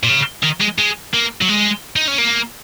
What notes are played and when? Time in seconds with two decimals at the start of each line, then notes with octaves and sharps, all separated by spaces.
0.03 A#2
0.09 C#3
0.43 D#3
0.61 G#3
0.79 G#3
1.14 A#3
1.41 F#3
1.49 G#3
1.96 D#4
2.08 C#4
2.18 A#3